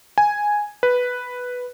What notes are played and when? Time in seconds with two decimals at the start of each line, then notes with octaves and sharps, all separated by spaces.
0.18 G#5
0.83 B4